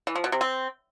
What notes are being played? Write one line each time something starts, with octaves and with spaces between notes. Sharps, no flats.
E3
F3
B2
C3
C4